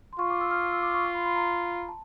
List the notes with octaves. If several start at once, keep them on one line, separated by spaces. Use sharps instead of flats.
C6
F4 C#6
D6
E6
F6
F6
E6
D6
C#6
C6
B5
B5
A#5
A5